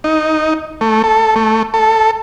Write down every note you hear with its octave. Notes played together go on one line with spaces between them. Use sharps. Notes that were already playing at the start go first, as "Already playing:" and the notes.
D#4
A3
A4
A3
A4